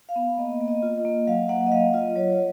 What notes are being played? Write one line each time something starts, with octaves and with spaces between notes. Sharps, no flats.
F5
B3
A#3 D#5
A#3
D#5
F4
D#5
A#3
F#3 F5
A#3 F#5
D#5
F#3 F5
F4 D#5
F#3 C#5